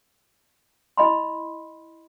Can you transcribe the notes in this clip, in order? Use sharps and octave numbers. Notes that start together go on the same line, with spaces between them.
E4 D#5 B5 C6